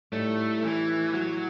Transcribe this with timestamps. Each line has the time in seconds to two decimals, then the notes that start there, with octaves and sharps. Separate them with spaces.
0.12 A2 G3 A3 D#4
0.63 E3
1.14 F#3